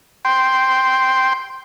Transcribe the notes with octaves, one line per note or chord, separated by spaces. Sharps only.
G5 C6